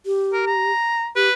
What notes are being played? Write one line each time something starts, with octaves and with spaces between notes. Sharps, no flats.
G4
A#4
A#5
G4 B4